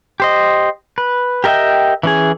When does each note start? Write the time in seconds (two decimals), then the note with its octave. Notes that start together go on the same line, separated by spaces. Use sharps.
0.20 G4 C5 D#5
0.98 B4
1.44 G4 A#4 D#5 E5 G5
2.03 E3 C#4 G#4